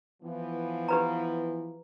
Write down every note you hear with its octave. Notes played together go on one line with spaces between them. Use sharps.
E3 F3 B3
G4 B4 A#5